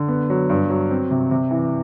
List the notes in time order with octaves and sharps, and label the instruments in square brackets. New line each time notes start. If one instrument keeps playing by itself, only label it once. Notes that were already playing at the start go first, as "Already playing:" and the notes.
Already playing: [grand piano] D3
B3
F#3
G2
F#3
C4
C3
C3
E3